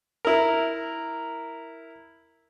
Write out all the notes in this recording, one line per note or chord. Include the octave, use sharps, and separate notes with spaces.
E4 A#4